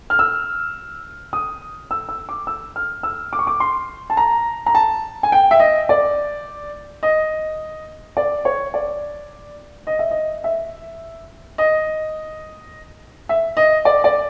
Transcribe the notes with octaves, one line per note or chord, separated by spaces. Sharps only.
F6
E6
D#6
E6
E6
D6
E6
F6
E6
D6
C#6
D6
C6
A5
A#5
A#5
A5
G#5
G5
E5
D#5
D5
D#5
D5
C#5
D5
D#5
E5
D#5
E5
D#5
E5
D#5
D5
D5